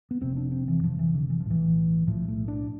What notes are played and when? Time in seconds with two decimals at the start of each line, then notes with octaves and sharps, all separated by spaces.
0.11 B3
0.21 F1 F2 C3 C4
0.37 D4
0.51 C4
0.68 E3
0.83 F1 F2 C3 F3
0.99 E3
1.14 D3
1.30 E3
1.40 F3
1.46 B1 A2 E3
2.07 B1 A2 F3
2.28 A3
2.48 D4